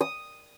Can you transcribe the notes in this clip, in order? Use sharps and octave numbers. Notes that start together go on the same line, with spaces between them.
D#6